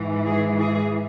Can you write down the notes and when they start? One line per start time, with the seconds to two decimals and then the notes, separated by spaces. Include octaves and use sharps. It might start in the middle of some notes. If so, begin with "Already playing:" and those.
Already playing: G#2 E3
0.27 G#4
0.59 G#4